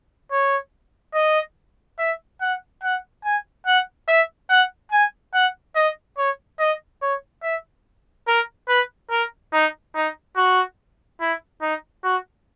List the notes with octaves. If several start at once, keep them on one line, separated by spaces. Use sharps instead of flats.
C#5
D#5
E5
F#5
F#5
G#5
F#5
E5
F#5
G#5
F#5
D#5
C#5
D#5
C#5
E5
A#4
B4
A#4
D#4
D#4
F#4
E4
D#4
F#4